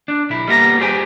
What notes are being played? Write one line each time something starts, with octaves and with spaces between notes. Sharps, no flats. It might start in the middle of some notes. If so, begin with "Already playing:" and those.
D4
B1 E4
G3 A#3 B3 E4 A#5
G4 G#4 C5 D5 G5 G#5